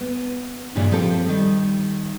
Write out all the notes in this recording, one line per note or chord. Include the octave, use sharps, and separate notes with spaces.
B3
G2 A#2 C#3 E3 G3
F3 C4 G4 A4
D#3 G3